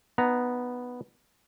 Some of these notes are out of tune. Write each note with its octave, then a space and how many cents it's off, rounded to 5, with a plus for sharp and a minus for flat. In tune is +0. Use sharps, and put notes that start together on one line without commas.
B3 +0 D#4 -30 A#5 +0